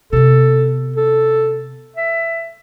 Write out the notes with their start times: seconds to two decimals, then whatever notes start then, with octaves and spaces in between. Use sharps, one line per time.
0.13 C3 B3 A4
0.96 A4
1.96 E5